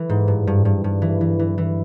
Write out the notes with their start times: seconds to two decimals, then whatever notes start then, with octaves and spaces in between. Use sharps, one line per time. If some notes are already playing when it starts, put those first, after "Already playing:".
Already playing: E3
0.09 G#2
0.28 G2
0.47 G2
0.65 G2
0.84 G2
1.02 E3
1.21 E3
1.39 E3
1.58 E3